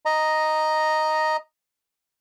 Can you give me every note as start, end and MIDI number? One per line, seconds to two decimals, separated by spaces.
0.05 1.37 75
0.05 1.37 82